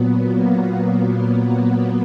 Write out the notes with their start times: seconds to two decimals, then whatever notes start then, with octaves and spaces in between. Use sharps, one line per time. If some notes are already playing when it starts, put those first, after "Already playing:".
Already playing: A#2 F#3 B3
0.26 A#3
0.67 F#3